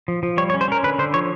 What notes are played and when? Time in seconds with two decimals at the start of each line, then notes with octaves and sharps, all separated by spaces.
0.08 F3
0.23 F3
0.38 G3 C#5
0.50 C#5
0.54 C#4
0.61 C5
0.68 C#4 A#4
0.83 D3 B4
0.99 D3 C5
1.14 F3 C#5